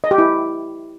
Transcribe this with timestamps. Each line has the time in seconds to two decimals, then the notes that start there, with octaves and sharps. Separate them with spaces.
0.04 D#5
0.11 G4
0.18 E4